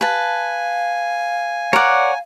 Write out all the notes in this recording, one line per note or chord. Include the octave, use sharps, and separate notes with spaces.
B4 F5 G#5 A5
A#4 C#5 D5 F#5